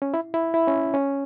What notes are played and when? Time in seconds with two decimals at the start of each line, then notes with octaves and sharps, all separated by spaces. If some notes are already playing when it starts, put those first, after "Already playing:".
0.02 C#4
0.14 E4
0.34 E4
0.54 E4
0.68 C#4
0.94 C#4